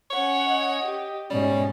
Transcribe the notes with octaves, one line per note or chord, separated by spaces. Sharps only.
C#4 C#5 F#5
D#5
G4
G#2 B2 G3 C#4